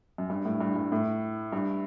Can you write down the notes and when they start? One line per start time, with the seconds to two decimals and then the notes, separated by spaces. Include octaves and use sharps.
0.18 F#2
0.30 G2
0.45 A2
0.61 G2
0.76 G2
0.92 A2
1.53 G2